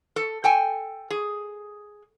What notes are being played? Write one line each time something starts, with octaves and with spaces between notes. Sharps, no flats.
A4
A4 G5 G#5
G#4